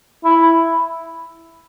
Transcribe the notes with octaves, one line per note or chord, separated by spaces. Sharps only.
E4